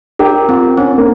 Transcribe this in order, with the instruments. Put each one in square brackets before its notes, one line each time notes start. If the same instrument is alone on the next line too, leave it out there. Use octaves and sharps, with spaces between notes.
[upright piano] G4 [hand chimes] A#4
[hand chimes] C4 [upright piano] F4
[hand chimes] C4 [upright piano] C#4
[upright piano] A#3